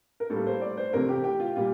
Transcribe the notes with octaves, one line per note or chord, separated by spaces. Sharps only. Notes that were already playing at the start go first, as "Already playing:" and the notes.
A#4
A2 G3 A#3 A4
C5
D5
C5
F2 C3 E3 A3 A#4
G4
G4
F4
A#2 G3 A#3 F4